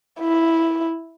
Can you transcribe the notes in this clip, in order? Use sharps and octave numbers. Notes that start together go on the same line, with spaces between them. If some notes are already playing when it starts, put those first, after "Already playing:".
E4